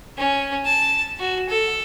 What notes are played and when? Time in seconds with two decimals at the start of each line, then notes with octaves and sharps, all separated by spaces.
0.17 C#4
0.65 A5
1.19 F#4
1.49 A4